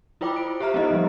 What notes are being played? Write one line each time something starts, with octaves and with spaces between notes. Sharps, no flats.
E4 F4 C5 G5 B5 D6
D7
G4 C5 E5 A#5 F6
B3 C4 D#4 E4 G4 D#5
F3 G3